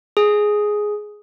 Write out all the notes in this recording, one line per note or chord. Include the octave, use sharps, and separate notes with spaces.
G#4